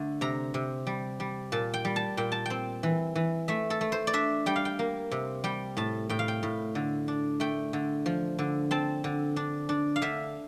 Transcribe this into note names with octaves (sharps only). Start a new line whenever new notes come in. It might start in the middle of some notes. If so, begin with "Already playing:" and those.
Already playing: D3 A3
C3 A#5
C3
G3
G3
A#2 A5
G5
G3
A5
A#2 G5
A5
C4 G5
E3
E3
A3 E5
A4
A3
C5
D5
D4 E5
G3 G5
F5
G5
A#3
C3
G3 G5
A2 A5
A2 G5
F5
G5
A2
D3
D4
A3 G5
D3
F3
D3
C4 A5
D3
D4
D4
F5
D3 E5